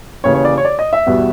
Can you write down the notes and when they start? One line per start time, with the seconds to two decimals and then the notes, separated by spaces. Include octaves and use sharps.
0.24 D#2 C#3 E3 C#5
0.34 C#5
0.45 D5
0.58 C#5
0.65 D5
0.79 D#5
0.93 E5
1.06 E2 B2 G3 B3